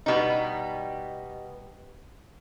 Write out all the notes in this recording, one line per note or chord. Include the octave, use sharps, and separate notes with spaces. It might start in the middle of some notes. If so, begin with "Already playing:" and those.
B2 G3 B3 D#4